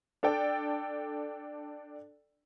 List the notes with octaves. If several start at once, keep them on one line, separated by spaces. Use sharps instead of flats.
D4 A4 D5 G5